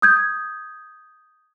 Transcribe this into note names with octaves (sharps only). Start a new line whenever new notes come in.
D#6 G6 G#6